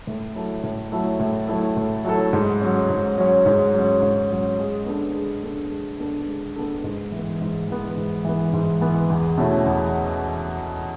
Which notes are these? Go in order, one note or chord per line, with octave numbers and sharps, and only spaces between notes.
A2
F#3 A3 E4 A4
A2
F#3 A3 E4 A4
A2
F#3 A3 E4 A4
A2
F#3 A3 E4 A4
G#2
F#3 C#4
G#2
F#3 C#4
G#2
F#3 C#4
G#2
F#3 C#4
G#3
B3 D4 A4
G#3
B3 D4 A4
G#3
B3 D4 A4
G#3
B3 D4 A4
G#2
E3 B3
G#2
E3 B3
G#2
E3 B3
G#2
E3 B3
E2
B2 A3 C#4 E4
E2